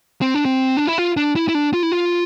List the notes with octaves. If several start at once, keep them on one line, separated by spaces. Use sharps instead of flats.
C4
D4
C4
D4
E4
F4
D4
E4
E4
D4
F4
E4
F4